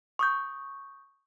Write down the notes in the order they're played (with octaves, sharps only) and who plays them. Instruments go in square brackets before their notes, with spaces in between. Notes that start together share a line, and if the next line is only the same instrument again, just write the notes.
[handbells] C#6 D#6 G6